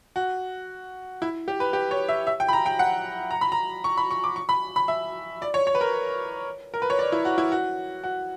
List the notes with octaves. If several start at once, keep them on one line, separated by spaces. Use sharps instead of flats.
F#4
E4
G4
B4
G4
C#5
E5
E5
G5
B5
A#5
G5
F#5
A#5
B5
A#5
C#6
B5
C#6
D6
C#6
B5
B5
E5
D5
C#5
C#5
B4
A#4
A#4
B4
C#5
D5
E4
F#4
E4
F#4
F#4